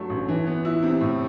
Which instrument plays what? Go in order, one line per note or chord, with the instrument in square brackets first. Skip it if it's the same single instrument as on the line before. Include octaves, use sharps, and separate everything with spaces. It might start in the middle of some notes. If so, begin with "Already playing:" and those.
Already playing: [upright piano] G2 F#3 A3
A1
E3
B3
E4
C3
A2